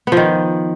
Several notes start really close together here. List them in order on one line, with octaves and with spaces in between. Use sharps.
B3 F3 D#3